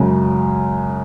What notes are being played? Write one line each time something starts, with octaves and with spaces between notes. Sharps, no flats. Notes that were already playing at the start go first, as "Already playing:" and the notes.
Already playing: F#2 C#3 G#3